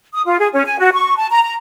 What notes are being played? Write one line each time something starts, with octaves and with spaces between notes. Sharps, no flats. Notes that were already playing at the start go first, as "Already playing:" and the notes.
D#6
F4
G#4
C#4
G#5
F#4
C#6
A5
A#5
A#5